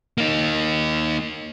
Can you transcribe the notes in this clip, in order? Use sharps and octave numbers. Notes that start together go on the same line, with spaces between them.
A#3 D#4